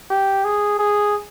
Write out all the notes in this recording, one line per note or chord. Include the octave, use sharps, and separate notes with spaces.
G4
G#4
G#4